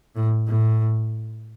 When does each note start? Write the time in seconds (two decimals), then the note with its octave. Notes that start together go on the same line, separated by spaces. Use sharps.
0.16 A2
0.47 A2